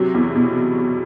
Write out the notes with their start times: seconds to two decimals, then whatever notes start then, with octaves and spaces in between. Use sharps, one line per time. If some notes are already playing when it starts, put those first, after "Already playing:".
Already playing: C3 F#3
0.14 E2
0.35 B2